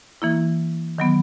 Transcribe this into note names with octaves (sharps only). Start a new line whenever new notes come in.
E3 A#3 E4
D#3 F#3 B3